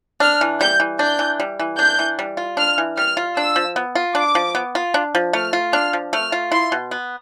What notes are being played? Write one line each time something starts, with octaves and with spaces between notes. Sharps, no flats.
D4 F6
E3
G3 G6
E3
D4 G6
E3
G3
E3
D4 G6
E3
G3
F4
D4 F6
E3
G3 F6
F4
D4 E6
F3
B3
F4
D4 D6
F3
B3
F4
D4
F3
A3 F6
F4
D4 F6
F3
A3 F6
F4
E4 C6
B2
B3